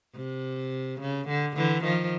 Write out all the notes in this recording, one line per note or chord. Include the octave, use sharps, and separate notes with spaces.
C3
C#3
D3
D3 E3
D#3 F3